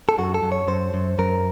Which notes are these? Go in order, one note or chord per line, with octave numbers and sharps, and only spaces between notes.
A4
F#2 F#4
A4
F#2
C#5
F#2 C5
F#2
F#2 A#4